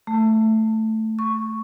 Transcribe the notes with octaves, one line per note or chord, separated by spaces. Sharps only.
A3
C#6